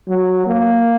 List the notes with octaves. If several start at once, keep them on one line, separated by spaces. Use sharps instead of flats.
F#3
A#3